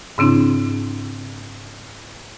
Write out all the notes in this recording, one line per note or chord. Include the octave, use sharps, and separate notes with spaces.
G#2 C#3 C4 D4 E4